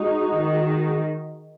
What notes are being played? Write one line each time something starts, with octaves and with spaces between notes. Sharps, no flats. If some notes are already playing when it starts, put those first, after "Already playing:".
Already playing: G#3 D#4 F#4
D#3